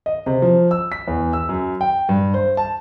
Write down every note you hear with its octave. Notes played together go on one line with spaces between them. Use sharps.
D#5
C3
F3
E6
B6
E2
E6
F#2
G5
G2
C5
A5